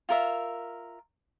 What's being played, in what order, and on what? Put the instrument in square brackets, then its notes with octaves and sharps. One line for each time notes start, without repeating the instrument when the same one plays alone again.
[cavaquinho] F4 A#4 E5